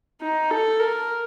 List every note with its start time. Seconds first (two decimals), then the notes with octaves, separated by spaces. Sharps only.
0.21 D#4
0.50 A4
0.79 A#4